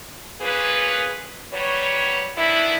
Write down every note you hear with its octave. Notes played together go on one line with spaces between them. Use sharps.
A#3 C#4 F4 G#4 B4
F#3 G3 B4 C#5
D#3 B3 D4 E4